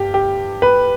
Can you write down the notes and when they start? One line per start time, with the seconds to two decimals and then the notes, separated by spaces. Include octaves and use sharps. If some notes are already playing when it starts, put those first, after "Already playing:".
Already playing: G2 G4
0.14 G4
0.62 B4